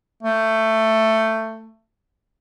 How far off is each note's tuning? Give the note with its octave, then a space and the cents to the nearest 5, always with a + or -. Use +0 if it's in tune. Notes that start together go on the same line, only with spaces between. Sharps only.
A3 +15